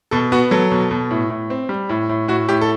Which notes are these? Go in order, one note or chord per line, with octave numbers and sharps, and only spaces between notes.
B2 A4
B3 F#4
F#3 A4
B2
B2
A2
A2
C4
G3
A2
A2
A2 F#4
A2 G4
A4